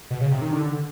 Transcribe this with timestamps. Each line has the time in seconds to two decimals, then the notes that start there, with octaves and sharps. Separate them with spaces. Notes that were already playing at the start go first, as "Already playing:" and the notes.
0.10 B2
0.21 C#3
0.31 C3
0.41 D#3
0.52 D3